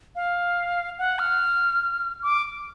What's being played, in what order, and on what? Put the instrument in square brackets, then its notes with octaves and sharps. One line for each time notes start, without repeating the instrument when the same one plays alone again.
[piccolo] F5
F#5
F6
D6